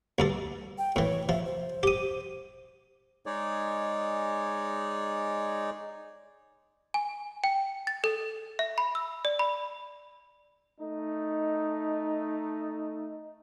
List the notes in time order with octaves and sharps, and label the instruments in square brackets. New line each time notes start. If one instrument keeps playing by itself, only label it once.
[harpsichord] D2 G2 A4
[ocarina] G5
[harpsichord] A2 E3 [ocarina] C#5
[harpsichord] F3 [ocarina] E5
[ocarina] C5
[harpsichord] G4 D#6
[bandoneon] G#3 D#4 G#4 C#5 D5
[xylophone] G#5
G5
A6
A4
E5
B5
E6
D5
B5
[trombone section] A3 D#4